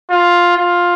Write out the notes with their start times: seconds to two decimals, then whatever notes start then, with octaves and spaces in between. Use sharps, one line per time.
0.10 F4
0.57 F4